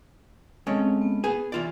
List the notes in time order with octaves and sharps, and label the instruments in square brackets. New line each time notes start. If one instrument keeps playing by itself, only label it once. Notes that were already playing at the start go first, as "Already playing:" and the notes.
[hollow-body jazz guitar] G#3 A3 C#4 [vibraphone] C4
[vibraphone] B3
[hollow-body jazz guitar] G#4 B4 G#5
E3 F4 D5